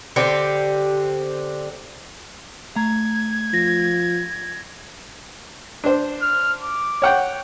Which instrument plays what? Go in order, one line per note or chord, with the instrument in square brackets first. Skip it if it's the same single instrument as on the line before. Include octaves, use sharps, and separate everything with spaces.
[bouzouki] D3 C4 G4
[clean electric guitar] A3 A#5 [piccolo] G#6
[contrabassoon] F3 [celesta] A#6
[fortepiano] D4 C5
[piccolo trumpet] F6
D6
[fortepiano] C#5 F#5 G5